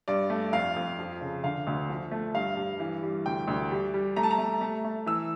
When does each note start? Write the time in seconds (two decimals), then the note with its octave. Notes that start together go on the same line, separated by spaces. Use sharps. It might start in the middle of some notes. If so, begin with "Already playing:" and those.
0.08 G2 D5
0.30 A3
0.53 F2 F5
0.76 F2
0.99 F3
1.21 C#3
1.44 D3 F5
1.67 D2
1.89 F3
2.12 A3
2.35 G2 F5
2.57 G2
2.80 E3
3.02 G3
3.26 D2 G5
3.48 D2
3.71 G3
3.94 G3
4.16 A3 A#5
4.23 A5
4.31 A#5
4.38 A3
4.61 A3
4.85 A3
5.06 E3 E6